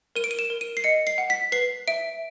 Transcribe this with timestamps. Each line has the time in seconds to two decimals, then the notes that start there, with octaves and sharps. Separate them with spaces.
0.16 A#4 D#7
0.24 D7
0.31 D#7
0.39 E7
0.50 A#4
0.61 D#7
0.77 C7
0.84 D#5 C#7
1.07 C7
1.18 F#5
1.30 B6
1.52 B4 C7
1.88 E5 D7